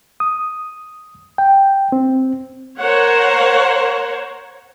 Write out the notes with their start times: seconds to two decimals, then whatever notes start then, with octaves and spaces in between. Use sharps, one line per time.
0.20 D#6
1.38 G5
1.92 C4
2.79 A#4 C5 C#5 F#5